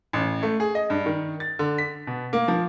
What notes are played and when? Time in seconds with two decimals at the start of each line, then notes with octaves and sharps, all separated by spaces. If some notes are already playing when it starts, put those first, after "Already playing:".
0.13 A1
0.43 A3
0.60 G#4
0.75 D#5
0.90 G2
1.06 D#3
1.40 A6
1.59 D3
1.78 B6
2.07 B2
2.33 A#3
2.48 F3